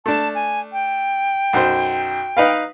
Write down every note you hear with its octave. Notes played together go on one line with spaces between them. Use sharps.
A3 D4 A5
G#5
G5
B1 F#2 C5
D#4 B4 F5